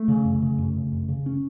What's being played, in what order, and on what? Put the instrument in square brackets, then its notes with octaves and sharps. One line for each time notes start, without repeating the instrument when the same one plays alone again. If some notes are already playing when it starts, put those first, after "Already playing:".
Already playing: [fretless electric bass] A3
C#3
F#2
C#3
F#2
C#3
F#2
C#3
C#4